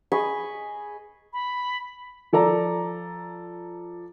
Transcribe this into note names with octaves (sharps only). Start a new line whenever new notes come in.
G#4 D#5 B5 C#6
B5
F3 A4 D5 A#5